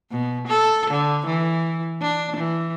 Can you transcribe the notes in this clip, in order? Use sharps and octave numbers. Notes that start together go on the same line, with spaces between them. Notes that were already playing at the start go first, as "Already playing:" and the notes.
B2
A4
D3
E3
D4
E3